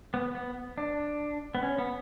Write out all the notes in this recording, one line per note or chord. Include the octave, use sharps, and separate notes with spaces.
B3
B3
D4
B3
C#4
B3